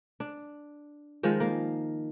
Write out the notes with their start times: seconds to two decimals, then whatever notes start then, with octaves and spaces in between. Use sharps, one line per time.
0.20 D4
1.23 D#3 F3 G#3
1.40 A#3